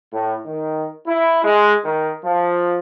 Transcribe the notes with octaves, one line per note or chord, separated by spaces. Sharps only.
A2
D#3
E4
G#3
D#3
F3